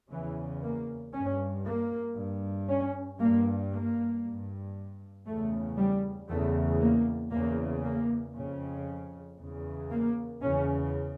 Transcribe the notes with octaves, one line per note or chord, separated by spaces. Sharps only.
E2 C#3 E3
A#3
G2 C#4
A#3
G2
C#4
G2 A#3
A#3
G2
E2 C#3 A3
G3
E2 C#3 A3
A#3
E2 C#3 A#3
A#3
F2 C#3
E2 C#3
A#3
E2 C#3 C#4